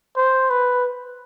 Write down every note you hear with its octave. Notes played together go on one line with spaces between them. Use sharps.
C5
B4